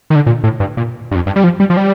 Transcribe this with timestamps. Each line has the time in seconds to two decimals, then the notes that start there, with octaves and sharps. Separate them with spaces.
0.10 D#3
0.15 D3
0.26 A#2
0.44 A2
0.60 G2
0.77 A#2
1.11 G2
1.15 F2
1.26 G2
1.36 G3
1.44 F3
1.60 G3
1.70 F3
1.77 G3